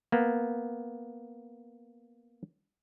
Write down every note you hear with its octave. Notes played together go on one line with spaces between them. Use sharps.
A#3 B3